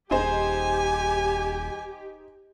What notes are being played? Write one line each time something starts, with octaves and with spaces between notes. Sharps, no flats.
D#1 D#4 G4 G#4 C5 G#5